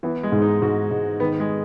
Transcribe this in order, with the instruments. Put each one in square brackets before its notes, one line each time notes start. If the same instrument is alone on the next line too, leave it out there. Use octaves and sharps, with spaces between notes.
[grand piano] E3 [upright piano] B3
[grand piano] G#3
[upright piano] G#2
[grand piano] D#4
[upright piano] G#2 [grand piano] F#4
[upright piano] G#2
[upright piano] D#3 [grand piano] B3
[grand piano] G#3